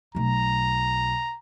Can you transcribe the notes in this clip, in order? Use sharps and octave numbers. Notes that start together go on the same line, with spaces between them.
B1 A3 A#5